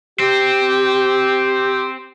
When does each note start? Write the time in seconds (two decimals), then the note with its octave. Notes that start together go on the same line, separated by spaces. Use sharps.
0.20 C4 G4